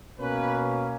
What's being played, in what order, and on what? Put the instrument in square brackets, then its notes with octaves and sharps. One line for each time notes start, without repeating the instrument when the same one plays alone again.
[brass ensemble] B2 A#3 C#4 B4